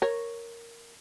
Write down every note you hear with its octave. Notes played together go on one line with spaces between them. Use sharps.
A#4 C#5